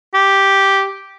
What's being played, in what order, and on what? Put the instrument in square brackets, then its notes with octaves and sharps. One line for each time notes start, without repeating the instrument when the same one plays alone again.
[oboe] G4